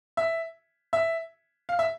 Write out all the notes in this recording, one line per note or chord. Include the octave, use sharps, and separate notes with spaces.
E5
E5
F5
E5